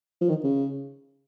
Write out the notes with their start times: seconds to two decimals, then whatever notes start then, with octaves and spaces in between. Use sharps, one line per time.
0.21 F3
0.29 D#3
0.44 C#3